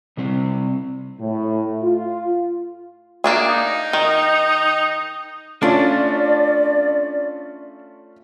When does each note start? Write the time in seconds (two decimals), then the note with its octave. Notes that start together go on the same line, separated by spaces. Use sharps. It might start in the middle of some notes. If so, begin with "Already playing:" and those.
0.17 C3 G3 C4
1.20 A2
1.82 F4
3.24 A#3 D4 G#4
3.48 D#4
3.93 D#3
5.63 A3 C#4 D4 F4 D5